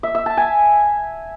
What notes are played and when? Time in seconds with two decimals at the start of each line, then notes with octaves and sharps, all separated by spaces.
0.03 E5
0.15 E5
0.26 A5
0.37 G#5